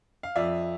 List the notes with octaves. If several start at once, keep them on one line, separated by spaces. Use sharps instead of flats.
F5
F2 D5 E5